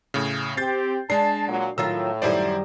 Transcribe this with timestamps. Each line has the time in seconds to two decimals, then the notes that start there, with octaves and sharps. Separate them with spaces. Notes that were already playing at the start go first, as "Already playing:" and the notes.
0.14 A2 C#3
0.57 C4 G4 G6 A6 C7
1.10 G#3 D4 A5 C7
1.48 A#2 F#3
1.78 A2 D#3 F#3 F4 E6
2.22 F#2 D#3 G3 E4 C5 D5